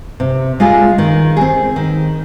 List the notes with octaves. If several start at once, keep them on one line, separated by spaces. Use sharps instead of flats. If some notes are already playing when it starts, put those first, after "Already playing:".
C3
G#3 F4 G#4
D#3
C4 G#4
D#3